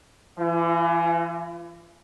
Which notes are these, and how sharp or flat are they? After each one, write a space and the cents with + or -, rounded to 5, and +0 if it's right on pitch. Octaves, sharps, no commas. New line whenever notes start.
E3 +30 F4 -30